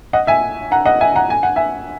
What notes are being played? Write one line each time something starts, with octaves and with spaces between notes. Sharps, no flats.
D#5 F#5
E5 G#5
F#5 A#5
D#5 F#5
E5 G#5
F#5 A#5
G#5
F#5
E5 G#5